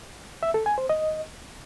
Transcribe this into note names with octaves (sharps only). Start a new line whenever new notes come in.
E5
A4
G#5
C5
D#5